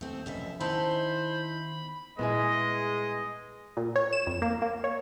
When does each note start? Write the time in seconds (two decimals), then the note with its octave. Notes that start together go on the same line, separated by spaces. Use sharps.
0.01 D#2 A3 C4
0.26 F1 F#2 B2 E5
0.60 D#3 B3 C#4 D#4 E4 C5 A5 B5
2.19 A#2 G3 G#3 B3 E4 G#4 D#5
3.77 A#2
3.96 C#5
4.13 E7
4.27 F2
4.42 A#3
4.62 A#3
4.84 C#5